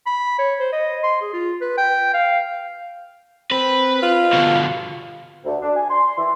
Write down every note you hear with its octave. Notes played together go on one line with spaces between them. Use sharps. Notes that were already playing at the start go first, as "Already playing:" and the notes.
B5
C#5
C5
D#5
C6
G#4
F4
B4
G5
F5
C4 B4
F4
B2 D3
D2
D4
G#5
C6
E3